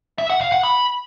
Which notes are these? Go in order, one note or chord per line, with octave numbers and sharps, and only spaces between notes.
E5
F#5
F5
F#5
B5